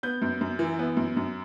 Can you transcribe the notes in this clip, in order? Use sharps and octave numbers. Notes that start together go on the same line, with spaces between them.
B3 G6
F#2
F#2
E3
B3
F#2
F#2